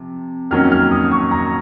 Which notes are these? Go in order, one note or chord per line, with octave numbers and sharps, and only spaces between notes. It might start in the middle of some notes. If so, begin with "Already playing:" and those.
Already playing: C3 F3
F2 D#3 F#3 A#3 C#4 F6
F6
D#6
C#6
A#5